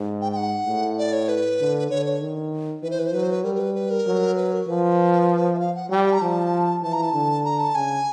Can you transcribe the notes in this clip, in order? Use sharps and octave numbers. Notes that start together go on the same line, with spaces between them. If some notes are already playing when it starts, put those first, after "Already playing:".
Already playing: G#2
G5
G5
F#5
A2
D5
C#5
B4
D3
D3 C#5
C#5
D#3
E3 B4
C5
B4
C5
F#3 B4
C5
B4
G3 A#4
A#4
B4
B4
A#4
F#3
B4
A#4
F3 B4
E5
F5
F#5
G3 G5
A#5
F3 A5
E3 A5
A#5
A5
D3
A#5
A5
C#3 G#5